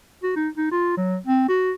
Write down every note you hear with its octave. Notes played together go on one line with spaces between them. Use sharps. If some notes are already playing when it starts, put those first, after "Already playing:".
F#4
D#4
D#4
F4
F#3
C4
F#4